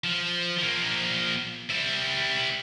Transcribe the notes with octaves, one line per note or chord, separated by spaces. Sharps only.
F3
F3 A#3
G3 E4